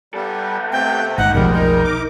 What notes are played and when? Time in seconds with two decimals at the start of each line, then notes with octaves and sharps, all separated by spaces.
0.14 G3 B3 A4
0.72 C3 A3 G5
1.18 G#1 D#2 D#4 F#5
1.34 F1 B1 F3 G3 G#3 A#4
1.53 D#4 A#4
1.85 D6